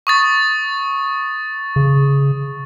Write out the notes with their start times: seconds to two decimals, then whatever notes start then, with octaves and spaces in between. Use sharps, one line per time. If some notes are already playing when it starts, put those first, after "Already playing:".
0.07 C#6 D#6 A6
1.76 C#3